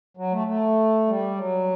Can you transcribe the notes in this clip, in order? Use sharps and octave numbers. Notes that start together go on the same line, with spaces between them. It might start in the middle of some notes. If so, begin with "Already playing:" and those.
F#3
A3
A3
G3
F#3